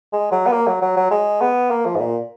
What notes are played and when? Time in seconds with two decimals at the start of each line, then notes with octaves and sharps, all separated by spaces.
0.13 G#3
0.32 F#3
0.47 B3
0.52 A#3
0.67 F#3
0.82 F#3
0.97 F#3
1.11 G#3
1.41 B3
1.70 A#3
1.86 F3
1.96 G#2
2.01 A#2